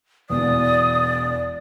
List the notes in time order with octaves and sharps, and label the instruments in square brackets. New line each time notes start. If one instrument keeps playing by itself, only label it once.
[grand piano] E1 E2 [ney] D5 [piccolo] D#6